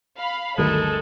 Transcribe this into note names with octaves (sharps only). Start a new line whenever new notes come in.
F5 B5
G1 D2 D#3 F#3 G#3 A4 A#4